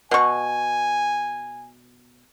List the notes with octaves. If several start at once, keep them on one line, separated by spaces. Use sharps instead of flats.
B2 G#5 C#6